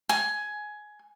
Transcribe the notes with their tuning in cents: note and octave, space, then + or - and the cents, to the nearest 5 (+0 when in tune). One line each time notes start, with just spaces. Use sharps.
G#5 +15